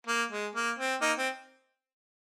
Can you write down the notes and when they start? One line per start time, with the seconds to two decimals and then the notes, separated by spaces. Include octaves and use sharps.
0.07 A#3
0.31 G#3
0.55 A#3
0.79 C4
1.01 A#3 D#4
1.18 C4